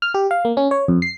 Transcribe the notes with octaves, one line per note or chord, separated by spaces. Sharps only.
F6
G4
F5
A#3
C#4
C#5
F2
C7